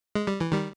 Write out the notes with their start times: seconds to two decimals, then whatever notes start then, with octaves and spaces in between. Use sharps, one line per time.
0.15 G#3
0.27 G3
0.40 E3
0.52 D#3 G3